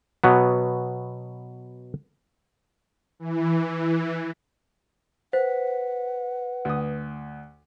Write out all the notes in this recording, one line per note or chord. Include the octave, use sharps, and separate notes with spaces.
B2 F#3 B3
E3
B4 C5 F#5
D2 D#6